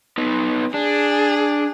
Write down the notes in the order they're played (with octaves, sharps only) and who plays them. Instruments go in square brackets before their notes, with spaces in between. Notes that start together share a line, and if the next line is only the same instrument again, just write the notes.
[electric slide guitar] B3 D#4 B4
[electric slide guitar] D4 [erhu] G#4